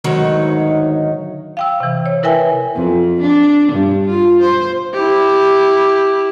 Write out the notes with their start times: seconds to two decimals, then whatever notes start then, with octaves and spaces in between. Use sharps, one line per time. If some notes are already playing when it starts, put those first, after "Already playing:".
0.04 D2 G#2 D#3 F#3 D#4 C#5
1.57 F5 G5 E6
1.80 C3 E3
2.06 C#5
2.23 E4 A#4 B4 E5 G5 G#5
2.75 F2
3.21 D4
3.72 G2
4.07 F4
4.41 C5
4.94 E4 G4